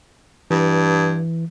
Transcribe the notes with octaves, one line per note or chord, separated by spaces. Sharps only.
G2 E3